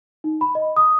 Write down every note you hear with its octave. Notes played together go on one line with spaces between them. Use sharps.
D#4
B5
D#5
D#6